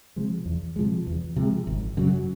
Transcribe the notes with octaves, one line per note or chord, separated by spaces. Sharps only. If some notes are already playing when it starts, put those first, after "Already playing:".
C3 F3 G#3
E2
C3 F3 G#3
E2
C3 F3 G#3
G#1
F#2 C#3 F#3